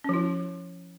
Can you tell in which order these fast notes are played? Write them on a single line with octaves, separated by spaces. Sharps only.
C#4 F3 E4